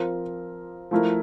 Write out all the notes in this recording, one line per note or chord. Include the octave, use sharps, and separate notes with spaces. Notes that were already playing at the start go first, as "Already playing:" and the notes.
Already playing: F3 C4 F4 A#4
F3 A3 E4 A#4